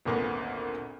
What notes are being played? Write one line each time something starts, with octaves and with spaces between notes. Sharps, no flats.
G#1 D2 A#2 A#3 B3